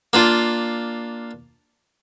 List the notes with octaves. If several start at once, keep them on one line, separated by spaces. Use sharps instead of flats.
A#3 D4 F4